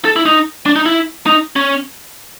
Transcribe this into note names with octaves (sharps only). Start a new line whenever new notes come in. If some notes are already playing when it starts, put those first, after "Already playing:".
A4
E4
D#4
D4
D#4
E4
D#4
C#4